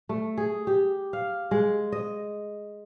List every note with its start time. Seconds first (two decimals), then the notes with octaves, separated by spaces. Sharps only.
0.09 A3
0.37 G#4
0.67 G4
1.13 F5
1.51 G#3
1.92 D#5